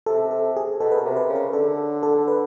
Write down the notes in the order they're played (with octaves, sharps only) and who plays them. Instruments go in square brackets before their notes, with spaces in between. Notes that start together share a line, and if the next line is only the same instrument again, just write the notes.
[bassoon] C3 [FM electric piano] A4
[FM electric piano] A4
G#4
[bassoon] B2 [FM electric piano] A4
[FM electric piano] B4
A#4
[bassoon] C3
[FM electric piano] B4
[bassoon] C#3
[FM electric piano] A#4
[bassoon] D3 [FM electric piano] A4
[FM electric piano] A4
B4